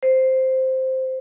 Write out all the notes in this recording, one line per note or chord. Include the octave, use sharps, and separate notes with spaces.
C5